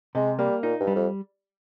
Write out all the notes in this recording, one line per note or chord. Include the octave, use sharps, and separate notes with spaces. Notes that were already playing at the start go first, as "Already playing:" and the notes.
C3 G#3
G3 A#3
A#2 D#4
G2
G3
F2